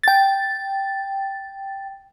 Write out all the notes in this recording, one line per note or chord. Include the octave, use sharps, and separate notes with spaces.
G5 A6